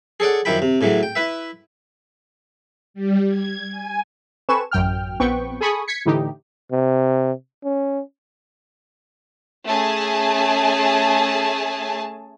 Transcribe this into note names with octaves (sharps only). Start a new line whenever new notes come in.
G#4 A4 C#5 D5 F#5
F#2 D#3 F3 E4 G5 B5
C3
A2 C#3 E3 F#3
G5
E4 B4 E5
G3
G#6
G#5
C4 A4 B4 G#5 C#6 E7
A1 F#2 G5 F6
A#1 B3 C4 B4 G5 C#6
G#4 A4 G#5 B5 C#6 D#6
G#6 B6 C#7
A2 D3 E3 D#4 G4
C3
C#4
A3 C#4 G#4 G#5 A5